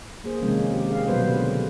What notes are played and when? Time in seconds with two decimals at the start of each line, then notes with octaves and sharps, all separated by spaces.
0.24 A#3 G#4 C5
0.42 C3 D#3 F3 G#3 A#3 C#4
0.72 D#3 G4
0.90 G#4 F5
1.07 B2 F#3 G3 B3 B4 C5
1.28 D3 G4